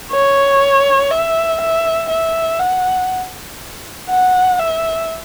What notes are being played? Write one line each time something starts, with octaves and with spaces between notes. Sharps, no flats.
C#5
E5
E5
E5
F#5
F#5
E5